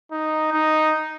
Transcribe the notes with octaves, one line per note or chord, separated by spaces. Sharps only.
D#4
D#4